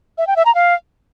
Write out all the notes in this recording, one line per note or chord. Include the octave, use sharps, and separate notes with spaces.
E5
G5
E5
A#5
F5